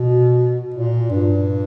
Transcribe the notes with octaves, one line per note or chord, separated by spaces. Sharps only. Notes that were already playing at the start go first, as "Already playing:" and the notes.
Already playing: B2
A#2
G2